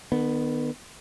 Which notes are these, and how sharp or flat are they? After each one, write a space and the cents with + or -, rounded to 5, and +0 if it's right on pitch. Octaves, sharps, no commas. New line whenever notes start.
D#3 -45 B3 +0